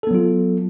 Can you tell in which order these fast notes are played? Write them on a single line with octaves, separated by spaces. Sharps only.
A4 B3 F#3 F4